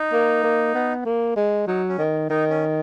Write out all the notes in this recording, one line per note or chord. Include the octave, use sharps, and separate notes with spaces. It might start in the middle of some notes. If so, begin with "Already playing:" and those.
Already playing: D#4
A#3
A#3
B3
A#3
G#3
F#3 D#4
C#4
D#3
D#3 D#4
C#4